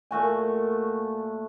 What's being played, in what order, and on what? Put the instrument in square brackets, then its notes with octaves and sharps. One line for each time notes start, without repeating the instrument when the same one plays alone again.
[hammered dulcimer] A#2 A3 F#4 G#5